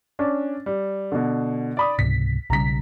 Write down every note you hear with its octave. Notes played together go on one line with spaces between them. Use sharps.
C#4 D4
G3
B2 D3
D5 B5 D#6
C#2 G#2 C3 B6
B1 C#3 G3 A#5 B6